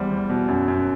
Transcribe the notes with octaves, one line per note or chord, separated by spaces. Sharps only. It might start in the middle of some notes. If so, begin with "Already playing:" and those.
Already playing: E2 G3 C5
E2
B2
F#2
F#2